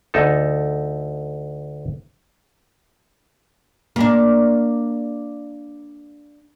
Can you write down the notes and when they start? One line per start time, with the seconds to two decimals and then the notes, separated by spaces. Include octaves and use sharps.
0.14 D2 D#4 A4
3.96 A#3 D4